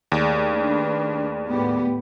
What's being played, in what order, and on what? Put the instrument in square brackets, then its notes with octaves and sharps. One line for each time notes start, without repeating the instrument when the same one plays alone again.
[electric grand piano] D#2 [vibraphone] A3 G#4 D5
[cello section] D4 B4
A2 B3 G4